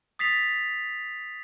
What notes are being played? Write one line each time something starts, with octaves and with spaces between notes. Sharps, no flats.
D#6 A6 B6 C7 F7